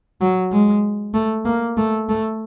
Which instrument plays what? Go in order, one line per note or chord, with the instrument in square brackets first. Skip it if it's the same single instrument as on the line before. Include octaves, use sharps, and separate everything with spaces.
[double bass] F#3
G#3
A3
A#3
A3
A3